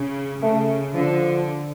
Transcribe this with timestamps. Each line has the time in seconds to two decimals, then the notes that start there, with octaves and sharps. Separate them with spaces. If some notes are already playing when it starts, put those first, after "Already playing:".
Already playing: C#3
0.43 C#3 A3
0.94 D3 F3